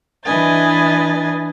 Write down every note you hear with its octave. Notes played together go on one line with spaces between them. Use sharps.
E3 D4 B4 D#5 G#5 A6